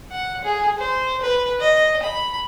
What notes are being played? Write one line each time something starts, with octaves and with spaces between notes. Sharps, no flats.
F#5
G#4
C5
B4
D#5
B5